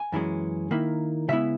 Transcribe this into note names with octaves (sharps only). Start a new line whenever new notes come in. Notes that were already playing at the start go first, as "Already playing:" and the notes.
Already playing: G#5
F#2 E3 G#3 C#4
D#3 A#3 E4
C#3 G#3 B3 E4 E5